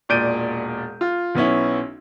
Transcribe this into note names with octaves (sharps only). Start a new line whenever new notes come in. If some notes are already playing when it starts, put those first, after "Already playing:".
E1 A#2 D5 G6 D7 D#7
F4
B1 B3 C#4 E4